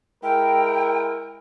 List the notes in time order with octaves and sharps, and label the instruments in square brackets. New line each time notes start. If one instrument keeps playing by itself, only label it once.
[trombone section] G#3 E4 A#4 [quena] G5